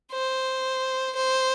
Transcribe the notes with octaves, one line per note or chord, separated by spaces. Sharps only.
C5
C5